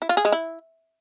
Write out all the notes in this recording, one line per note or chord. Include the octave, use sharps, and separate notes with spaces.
E4
F4
G#4
G#3
E4